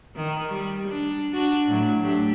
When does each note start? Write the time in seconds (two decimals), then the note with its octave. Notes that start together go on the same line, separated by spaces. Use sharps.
0.16 D#3
0.52 G3
0.88 D4
1.33 D4 F#4
1.68 A2 F#3
2.01 A3 D4 G4